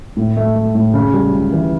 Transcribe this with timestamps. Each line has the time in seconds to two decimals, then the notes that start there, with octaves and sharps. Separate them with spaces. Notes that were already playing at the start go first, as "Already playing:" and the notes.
0.17 A2
0.37 A3
0.56 A3
0.75 A2
0.94 C#3
1.14 G3
1.33 C#2
1.52 E3